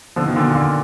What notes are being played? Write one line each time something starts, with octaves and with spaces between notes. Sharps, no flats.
D3 F3
B2 D#3
A#2 D3
B2
A#2 D3